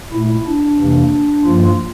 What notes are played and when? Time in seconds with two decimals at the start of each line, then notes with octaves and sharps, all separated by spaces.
0.12 A#2 A3 E4
0.46 D4
0.79 F2 C3 E3 A#3
1.44 G2 F3 A#3 F4